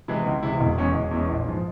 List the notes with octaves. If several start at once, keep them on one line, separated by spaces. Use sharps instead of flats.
C3 E3 G#3 E4
C#2
C3 E3 G#3 E4
E1
E2 E3 G#3 C#4
E1
E2 E3 G#3 C#4
A#1
G#2 F3 G#3